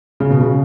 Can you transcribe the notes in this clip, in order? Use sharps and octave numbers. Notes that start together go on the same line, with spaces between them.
C#3
B2
C#3